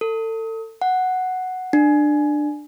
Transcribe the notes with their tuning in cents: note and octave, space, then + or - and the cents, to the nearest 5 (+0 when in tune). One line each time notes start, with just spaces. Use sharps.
A4 +30
F#5 +0
D4 +15